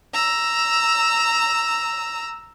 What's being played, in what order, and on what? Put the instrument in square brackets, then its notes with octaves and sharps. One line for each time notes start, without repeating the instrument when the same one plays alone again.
[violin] A#5 E6